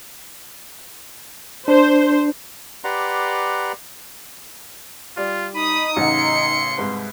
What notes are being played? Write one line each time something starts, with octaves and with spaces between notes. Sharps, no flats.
D4 C5
G4 B4 D5 F#5 A#5 C6
G3 F4 D5
D#4 B5 D#6 D#7
A1 C#3 F#5 C6 C#7
C2 G#2 B4